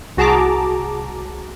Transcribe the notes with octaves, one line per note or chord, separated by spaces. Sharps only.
C2 F#4 G#4 A5 A#5 D6